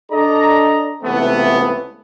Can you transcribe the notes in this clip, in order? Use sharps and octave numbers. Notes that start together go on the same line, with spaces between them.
D4 A4 D5 D#5 A#5
C#2 C3 E3 A3 B3